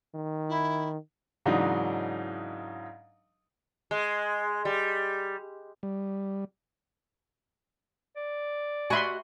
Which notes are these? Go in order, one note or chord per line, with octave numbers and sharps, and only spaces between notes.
D#3
E4
G#2 C#3 E3 F#3 D4 D#4
G#3
G3
G3
D5
F#4 E5 G#5 B5 C6